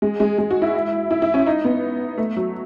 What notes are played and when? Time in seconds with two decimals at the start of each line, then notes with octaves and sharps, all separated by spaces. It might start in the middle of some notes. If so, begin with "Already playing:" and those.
0.02 G#3
0.20 G#3
0.38 G#3
0.51 F#4
0.62 E4
1.11 E4
1.22 E4
1.34 C#4
1.46 D#4
1.64 B3
2.18 A3
2.36 F#3